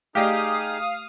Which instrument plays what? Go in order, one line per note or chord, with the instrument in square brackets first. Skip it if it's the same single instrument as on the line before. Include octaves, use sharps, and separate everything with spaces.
[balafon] A3 D5 D#5 [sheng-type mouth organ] D#4 G#4 [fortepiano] G4 [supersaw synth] F5 D#6